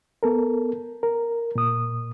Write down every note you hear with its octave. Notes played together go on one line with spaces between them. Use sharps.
B3 A4 A#4
A#4
A#2 D#6